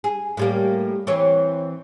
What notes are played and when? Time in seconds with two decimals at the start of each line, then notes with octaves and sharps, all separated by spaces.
0.04 G#4
0.37 A2 G3 A#3
1.07 E3 C4 C#5